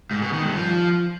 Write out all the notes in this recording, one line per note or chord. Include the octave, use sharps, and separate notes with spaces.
G#2
B2
D#3
G2
F3